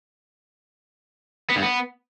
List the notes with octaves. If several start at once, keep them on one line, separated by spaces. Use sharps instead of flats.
B3
G2
B3